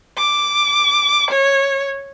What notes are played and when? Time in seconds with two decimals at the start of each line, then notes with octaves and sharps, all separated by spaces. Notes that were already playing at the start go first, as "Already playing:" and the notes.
0.18 D6
1.31 C#5